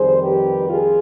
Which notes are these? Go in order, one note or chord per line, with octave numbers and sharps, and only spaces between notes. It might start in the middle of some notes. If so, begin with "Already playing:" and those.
Already playing: F2 D#3 G3 G#4 C5
G4 B4
F4 G#4